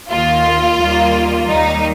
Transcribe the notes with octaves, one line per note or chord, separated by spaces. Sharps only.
D#2 D#3 A#3 F4
D#2 D#3 G3 A#3
D#2 D#3 G3 D#4